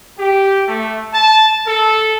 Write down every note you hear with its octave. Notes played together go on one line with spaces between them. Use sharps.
G4
A3
A5
A4